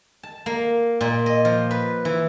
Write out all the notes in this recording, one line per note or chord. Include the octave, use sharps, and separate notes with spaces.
A5
A#3
A#2
D#5
F3
B4
E3